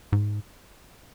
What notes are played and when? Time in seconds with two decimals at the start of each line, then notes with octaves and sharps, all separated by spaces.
0.13 G#2